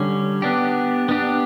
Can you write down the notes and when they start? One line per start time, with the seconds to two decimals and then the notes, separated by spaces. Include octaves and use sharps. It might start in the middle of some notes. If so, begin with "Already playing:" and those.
Already playing: D3 G3 C#4
0.42 B3 D4 G4
1.09 B3 D4 G4